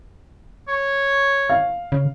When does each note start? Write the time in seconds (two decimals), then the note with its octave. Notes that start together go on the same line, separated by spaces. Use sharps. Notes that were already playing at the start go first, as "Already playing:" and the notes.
0.68 C#5
1.49 F5
1.92 C#3